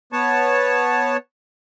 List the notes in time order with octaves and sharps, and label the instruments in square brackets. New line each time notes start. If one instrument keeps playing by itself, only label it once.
[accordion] B3 C#5 A5